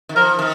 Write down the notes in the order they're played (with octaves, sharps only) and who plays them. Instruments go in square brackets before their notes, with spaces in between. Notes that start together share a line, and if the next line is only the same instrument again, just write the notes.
[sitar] D#3
[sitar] F3 [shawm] A#4
[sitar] D#3